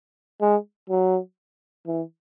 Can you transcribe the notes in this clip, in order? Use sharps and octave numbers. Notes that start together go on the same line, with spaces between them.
G#3
F#3
E3